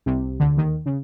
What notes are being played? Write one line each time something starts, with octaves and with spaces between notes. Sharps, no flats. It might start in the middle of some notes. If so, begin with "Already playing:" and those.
C2 C3
D2 D3
D#2 D#3
C#3